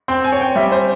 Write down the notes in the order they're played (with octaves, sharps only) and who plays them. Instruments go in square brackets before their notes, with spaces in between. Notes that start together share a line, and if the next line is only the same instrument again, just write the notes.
[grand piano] C4 [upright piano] G5
[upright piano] G#5
[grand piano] C#5
[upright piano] G5
[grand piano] G3 [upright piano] E5
[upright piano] C5